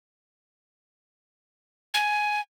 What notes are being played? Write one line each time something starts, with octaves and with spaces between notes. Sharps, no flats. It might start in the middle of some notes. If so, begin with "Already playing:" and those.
G#5